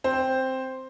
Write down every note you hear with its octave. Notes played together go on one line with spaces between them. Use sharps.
C4 C5